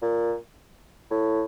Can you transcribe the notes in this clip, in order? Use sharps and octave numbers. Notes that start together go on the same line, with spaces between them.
A#2
A2